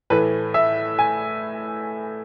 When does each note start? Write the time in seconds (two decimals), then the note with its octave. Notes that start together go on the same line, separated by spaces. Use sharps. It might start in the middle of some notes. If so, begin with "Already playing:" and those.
0.10 A2 E3 A3 B4
0.54 E5
0.99 G#5